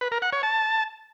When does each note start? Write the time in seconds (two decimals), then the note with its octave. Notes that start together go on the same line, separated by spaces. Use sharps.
0.01 B4
0.12 A#4
0.22 F#5
0.33 C#5
0.43 A5